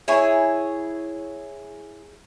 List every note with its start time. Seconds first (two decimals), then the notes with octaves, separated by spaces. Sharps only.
0.08 E4 G#4 C#5